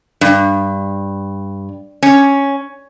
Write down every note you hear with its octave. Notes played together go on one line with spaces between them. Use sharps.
G2
C#4